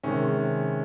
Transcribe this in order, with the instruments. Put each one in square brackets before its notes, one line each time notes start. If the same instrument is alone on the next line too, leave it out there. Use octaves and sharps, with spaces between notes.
[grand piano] C3 D#3 G#3 C#4